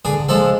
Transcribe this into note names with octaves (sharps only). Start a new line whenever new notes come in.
D3 G#4
F3 G#3 A4